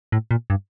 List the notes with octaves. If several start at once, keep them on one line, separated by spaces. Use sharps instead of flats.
A2
A#2
G2